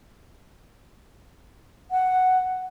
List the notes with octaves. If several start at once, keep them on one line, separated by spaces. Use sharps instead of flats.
F#5